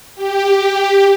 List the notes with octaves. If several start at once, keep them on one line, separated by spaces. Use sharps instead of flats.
G4